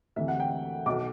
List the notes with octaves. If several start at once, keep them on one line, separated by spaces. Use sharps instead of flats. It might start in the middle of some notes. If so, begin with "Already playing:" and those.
D2 C3 E3 E5
F#5
G5
B1 B2 D6